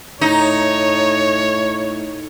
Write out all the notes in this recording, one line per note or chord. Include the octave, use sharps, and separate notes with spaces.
A2 D#4 C#5